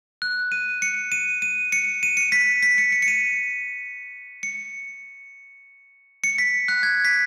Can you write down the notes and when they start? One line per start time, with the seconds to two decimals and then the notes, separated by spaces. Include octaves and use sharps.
0.22 F#6
0.52 D#7
0.82 C#7
1.12 D#7
1.42 D#7
1.72 C#7
2.03 D#7
2.17 C#7
2.32 B6
2.63 B6
2.78 C#7
2.92 C#7
3.02 C#7
3.08 D#7
4.43 C#7
6.24 C#7
6.38 B6
6.68 F#6
6.83 G#6
7.05 B6